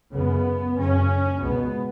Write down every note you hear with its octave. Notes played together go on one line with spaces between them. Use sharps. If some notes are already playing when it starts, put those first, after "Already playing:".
F#2 C#3 B3
F#2 C#3 C#4
C#2 B2 B3